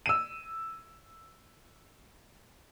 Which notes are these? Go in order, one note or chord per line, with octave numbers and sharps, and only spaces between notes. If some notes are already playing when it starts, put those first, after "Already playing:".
E6 D#7